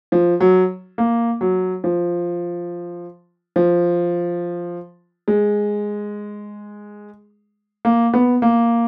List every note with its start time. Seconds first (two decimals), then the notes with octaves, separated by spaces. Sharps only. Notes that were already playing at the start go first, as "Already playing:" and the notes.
0.12 F3
0.40 F#3
0.98 A#3
1.41 F#3
1.84 F3
3.56 F3
5.28 G#3
7.85 A#3
8.14 B3
8.42 A#3